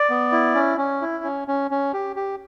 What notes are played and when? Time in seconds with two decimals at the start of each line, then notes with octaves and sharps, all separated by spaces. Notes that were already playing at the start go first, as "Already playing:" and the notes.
Already playing: D5
0.10 B3
0.32 E4
0.55 C#4
0.78 C#4
1.02 E4
1.24 C#4
1.48 C#4
1.71 C#4
1.93 G4
2.16 G4